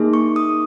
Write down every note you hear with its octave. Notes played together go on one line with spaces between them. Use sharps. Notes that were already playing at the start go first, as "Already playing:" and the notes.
Already playing: A#3 D#4 G#4
C#6
D#6